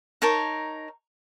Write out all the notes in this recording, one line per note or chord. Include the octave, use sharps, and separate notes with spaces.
D#4 A#4 C#5 A5